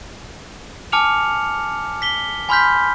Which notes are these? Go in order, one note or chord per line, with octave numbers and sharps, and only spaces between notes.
G#5 A5 D6 F6 C#7 F7
B6 G7
G#5 B5 C6 F6 G6 B6